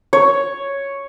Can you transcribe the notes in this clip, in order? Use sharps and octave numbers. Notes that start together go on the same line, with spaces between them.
C#5